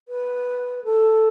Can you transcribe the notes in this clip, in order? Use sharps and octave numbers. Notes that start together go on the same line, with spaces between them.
B4
A4